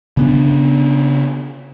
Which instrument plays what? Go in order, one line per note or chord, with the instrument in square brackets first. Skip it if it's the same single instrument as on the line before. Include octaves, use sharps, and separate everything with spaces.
[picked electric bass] C#3 B3 D4